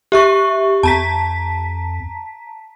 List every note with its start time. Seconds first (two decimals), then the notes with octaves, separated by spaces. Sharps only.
0.12 G4 E5 C#6
0.83 F2 A5 A#5 B6